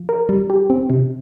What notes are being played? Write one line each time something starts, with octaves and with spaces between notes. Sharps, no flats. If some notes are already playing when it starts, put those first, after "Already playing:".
Already playing: F3
A#4
G3
G4
C4
C3